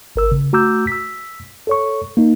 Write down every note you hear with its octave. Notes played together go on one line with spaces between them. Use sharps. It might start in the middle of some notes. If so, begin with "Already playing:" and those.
G#1 A#4 E6
C#3
A3 F#4 A#5 D6 E6 G6
E6 B6
A4 C#5 C#6
A#3 D#4